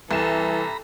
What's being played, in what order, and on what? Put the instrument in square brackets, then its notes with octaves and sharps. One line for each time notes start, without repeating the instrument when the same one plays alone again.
[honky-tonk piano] C2 E7 [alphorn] E3 [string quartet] A4 [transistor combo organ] A#5 B5